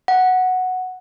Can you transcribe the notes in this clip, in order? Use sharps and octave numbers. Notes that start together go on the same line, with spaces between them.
F#5